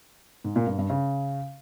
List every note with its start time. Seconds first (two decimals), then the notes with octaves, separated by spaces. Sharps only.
0.44 G#2
0.56 A#2
0.67 G2
0.78 G2
0.90 C#3